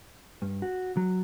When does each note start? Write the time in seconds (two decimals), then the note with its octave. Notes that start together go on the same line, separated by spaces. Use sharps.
0.42 G2
0.62 F#4
0.97 F#3